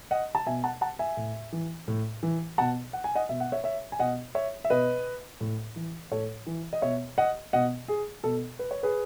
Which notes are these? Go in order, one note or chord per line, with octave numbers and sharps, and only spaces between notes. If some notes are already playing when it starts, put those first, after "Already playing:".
D#5 F#5
A5
B2 E5 G#5
F#5 A5
F#5 A5
E5 G#5
A2
E3
A2
E3
B2 F#5 A5
F#5
G#5
D#5 F#5
B2 E5
F#5
C#5 E5
C#5 E5
G#5
B2 D#5 F#5
C#5 E5
E5
B2 B4 D#5
A2
E3
A2 A4 C#5
E3
D#5
B2 C#5 E5
D#5 F#5
B2 D#5 F#5
G#4
B2 A4
B4
C#5
G#4 B4